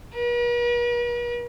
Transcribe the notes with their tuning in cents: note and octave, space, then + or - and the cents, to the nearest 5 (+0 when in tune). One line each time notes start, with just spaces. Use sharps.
B4 -45